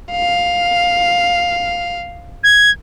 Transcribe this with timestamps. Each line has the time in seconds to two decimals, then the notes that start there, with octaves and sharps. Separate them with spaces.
0.11 F5
2.44 G#6